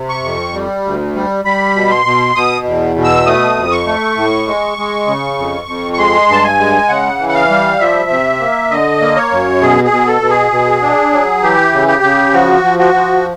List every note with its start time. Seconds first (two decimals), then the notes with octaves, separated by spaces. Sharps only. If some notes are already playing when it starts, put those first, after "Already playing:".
Already playing: C3
0.09 C#6
0.24 F2
0.54 G3
0.85 D2
1.15 G3
1.45 G3 B5
1.75 B2
1.91 C6
2.06 B2
2.36 B2 D#6
2.66 E2
2.96 B2
3.04 E6
3.26 A3 D#6
3.57 F2
3.72 C#6
3.87 A3
4.17 A2
4.47 G#3
4.78 G#3
5.07 C#3
5.38 F2
5.68 F2
5.93 C#6
5.98 G#3 C6
6.29 G2 A5
6.44 G#5
6.59 G#3
6.89 C#3 F#5
7.19 E3
7.29 F#5
7.34 F5
7.50 G3
7.80 F3 E5
8.10 C3
8.40 A#3
8.70 D3 D#5
9.01 A#3
9.16 C#5
9.31 F#2
9.62 B2 G#4
9.84 G#4
9.91 B2
10.07 A4
10.22 B2
10.29 G#4
10.52 B2
10.82 D4
11.13 F#3
11.42 E3 G4
11.73 C#3
11.88 G4
12.03 C#3
12.33 F3 F#4
12.64 F3
12.79 F#4
12.94 F3